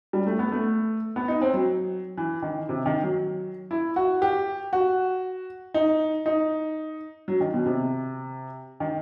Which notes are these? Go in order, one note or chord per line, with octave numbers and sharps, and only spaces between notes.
G3
A3
B3
A3
B3
D#4
C4
F#3
E3
D#3
C3
D#3
F#3
E4
F#4
G4
F#4
D#4
D#4
F#3
D#3
B2
C3
D#3